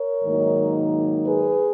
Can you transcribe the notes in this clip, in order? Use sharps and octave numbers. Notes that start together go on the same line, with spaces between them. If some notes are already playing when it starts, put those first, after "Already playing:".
Already playing: A#4 C#5
G#2 D#3 F#3 A#3 D#4
G#4 B4